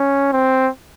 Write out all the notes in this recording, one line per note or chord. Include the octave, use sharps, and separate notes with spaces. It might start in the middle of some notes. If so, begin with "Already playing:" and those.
Already playing: C#4
C4